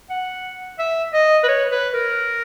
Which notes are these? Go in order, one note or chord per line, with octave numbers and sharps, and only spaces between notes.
F#5
E5
D#5
B4
C#5
B4
A#4